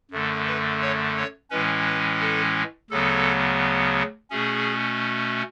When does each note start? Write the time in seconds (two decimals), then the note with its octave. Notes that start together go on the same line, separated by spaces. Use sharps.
0.11 F#2 D3 A3
0.47 B4
0.81 C#5
1.16 C#5
1.51 A2 E3 G#3 C#4 B4
1.86 B4
2.21 A4
2.90 D2 C#3 F#3 B3 A4
4.30 B2 A3 C#4 G#4